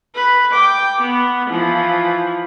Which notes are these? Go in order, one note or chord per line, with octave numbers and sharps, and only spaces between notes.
B4
G5 D6
B3
E3 F3